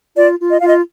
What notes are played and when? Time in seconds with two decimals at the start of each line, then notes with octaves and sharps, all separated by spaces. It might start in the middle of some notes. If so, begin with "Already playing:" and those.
0.16 F4 D5
0.40 F4
0.50 D#5
0.59 F4 F5
0.68 D#5